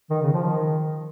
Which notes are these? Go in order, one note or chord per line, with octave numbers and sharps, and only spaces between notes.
D#3
C#3
F3
D#3